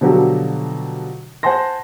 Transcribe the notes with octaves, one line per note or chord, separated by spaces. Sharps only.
B2 D3 F3 F#3 G4
C5 F#5 G#5 A5 C6 A#6